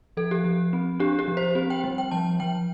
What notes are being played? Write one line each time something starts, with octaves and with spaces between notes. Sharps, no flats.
F3 A4
G4
F3
C4
D4 G4
G4
F3
C5
C4 G4
G5
G3
G5
F3 A5
F3 G5